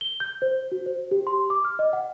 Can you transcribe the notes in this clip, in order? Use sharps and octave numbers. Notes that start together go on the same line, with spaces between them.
G7
G6
C5
F#4
C5
G4
C6
D6
F6
D#5
F#5